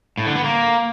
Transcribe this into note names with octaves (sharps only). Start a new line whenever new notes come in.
A2
D3
B3
A#3